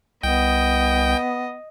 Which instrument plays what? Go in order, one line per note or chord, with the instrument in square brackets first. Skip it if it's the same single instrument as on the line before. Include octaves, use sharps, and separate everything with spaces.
[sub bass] C2 [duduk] B3 [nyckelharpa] D#5 [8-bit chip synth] G5